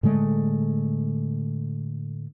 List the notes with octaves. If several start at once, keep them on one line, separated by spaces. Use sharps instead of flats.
A2 D3 G#3 A3